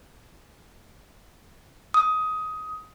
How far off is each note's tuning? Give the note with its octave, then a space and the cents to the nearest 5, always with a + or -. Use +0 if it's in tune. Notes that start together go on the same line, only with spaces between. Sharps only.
D#6 +15